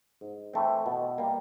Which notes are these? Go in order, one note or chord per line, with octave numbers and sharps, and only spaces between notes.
G#2
E3 A3 C4
B2
G3 A#3